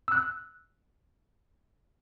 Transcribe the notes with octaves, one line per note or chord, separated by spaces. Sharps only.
E6 F#6